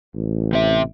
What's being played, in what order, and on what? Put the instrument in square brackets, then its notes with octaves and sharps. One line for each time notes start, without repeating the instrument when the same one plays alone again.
[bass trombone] A1
[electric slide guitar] C3 E5